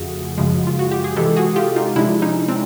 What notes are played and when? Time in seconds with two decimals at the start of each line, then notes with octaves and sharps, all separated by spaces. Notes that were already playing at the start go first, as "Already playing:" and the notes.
Already playing: F2 C#3 F3 A3 F#4 G#4
0.37 F#2 C#3 F3 G#3
0.67 F4
0.79 F#4
0.91 G4
1.04 G#4
1.16 C3 E3 G#3 G4 A4
1.36 F#4 G#4
1.56 F4 G4
1.76 D#4 F4
1.96 C3 F3 G#3 D4 E4
2.22 C#4 D#4
2.48 C4 D4